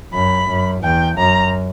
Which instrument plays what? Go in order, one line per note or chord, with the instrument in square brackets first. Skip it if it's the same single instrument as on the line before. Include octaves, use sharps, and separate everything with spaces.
[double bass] F#2 [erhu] B5
[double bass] F#2
[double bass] E2 [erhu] G5
[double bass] F#2 [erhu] A#5